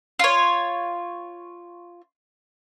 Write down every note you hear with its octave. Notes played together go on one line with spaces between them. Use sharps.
F4 C#5